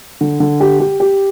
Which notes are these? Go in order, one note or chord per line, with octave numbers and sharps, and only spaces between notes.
D3
D3
G4
G4
G4